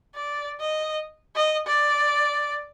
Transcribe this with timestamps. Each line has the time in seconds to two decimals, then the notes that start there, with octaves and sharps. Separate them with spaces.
0.15 D5
0.60 D#5
1.36 D#5
1.66 D5